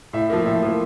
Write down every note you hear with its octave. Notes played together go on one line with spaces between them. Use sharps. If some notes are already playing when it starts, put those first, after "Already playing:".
A2 E5
F3 A#3
A2 E5
F3 A#3